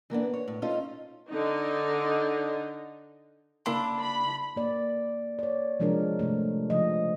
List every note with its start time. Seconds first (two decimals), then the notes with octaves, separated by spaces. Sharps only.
0.10 E3 A#3 B3 D4
0.34 C#5
0.48 A2
0.62 C#4 D#4 F4 A4 C5 D#5
1.30 D3 D#4
3.66 C#3 A#3 D4 E4 C6
4.01 B5
4.56 A#3 D5
5.39 C#5 D5
5.80 C3 F3 G#3 D4 E4 A#4
6.19 C3 A3
6.70 C#3 F3 D#5